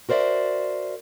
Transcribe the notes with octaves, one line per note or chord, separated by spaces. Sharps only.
F#4 A#4 C5 D5 E5